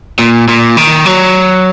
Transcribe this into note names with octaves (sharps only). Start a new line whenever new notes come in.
A#2
A#2
D#3
F#3